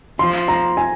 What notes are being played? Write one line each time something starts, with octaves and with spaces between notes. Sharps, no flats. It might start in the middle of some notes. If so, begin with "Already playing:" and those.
F3 C6
A#5
G#5